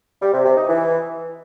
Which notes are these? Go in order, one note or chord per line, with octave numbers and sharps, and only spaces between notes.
G3
C3
C3
D#4
E3